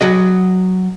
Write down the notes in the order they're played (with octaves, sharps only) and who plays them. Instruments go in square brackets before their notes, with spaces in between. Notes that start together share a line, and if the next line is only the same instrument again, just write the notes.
[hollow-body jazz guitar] F#3 F#4 D#5